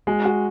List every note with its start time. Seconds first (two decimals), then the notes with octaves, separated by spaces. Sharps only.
0.07 G#3 F#4
0.25 F#4